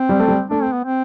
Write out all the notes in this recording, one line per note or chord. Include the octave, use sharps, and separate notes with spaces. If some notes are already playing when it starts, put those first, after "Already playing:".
Already playing: C4
G3
A3
G3
A3 D4
C4
B3
C4